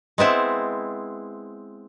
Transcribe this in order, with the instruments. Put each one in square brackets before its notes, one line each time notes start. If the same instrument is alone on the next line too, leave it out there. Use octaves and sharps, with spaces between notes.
[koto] G#3 B3 C4 E4